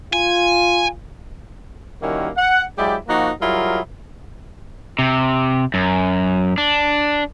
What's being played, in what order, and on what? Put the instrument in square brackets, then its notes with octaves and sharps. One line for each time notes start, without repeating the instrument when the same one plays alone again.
[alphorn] F4 [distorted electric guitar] G#5
[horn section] D#3 G3 A#3 C#4 E4 F#4
F#5
F#3 G#3 E4 G4 D5 G5
F3 A#3 D#4 F#4
F#3 G3 E4 F4 G#4 A#4
[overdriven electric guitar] C3
F#2
D4